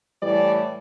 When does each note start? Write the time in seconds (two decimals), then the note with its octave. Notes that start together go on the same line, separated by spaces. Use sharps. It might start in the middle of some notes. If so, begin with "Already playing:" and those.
0.22 A2 E3 G3 D5